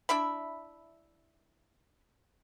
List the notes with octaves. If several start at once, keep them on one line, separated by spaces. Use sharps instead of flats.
D4 E4 E5 B5